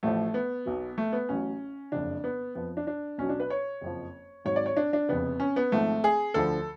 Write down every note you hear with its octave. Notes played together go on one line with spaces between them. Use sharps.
A1 A2 F3 A3
B3
B1 B2 F#3
A3
B3
A1 A2 F#3 C#4
F#1 F2 C#3 D4
B3
F2 F3 B3
D4
D4
B1 B2 F#3 C#4
D4
B4
C#5
F#1 F2 F3
G#1 G#2 F#3 C#5
D5
C#5
D4
D4
F1 F2 C#3 B3
C#4
B3
G#1 G#2 F3 A3
G#4
D2 D3 F3 A4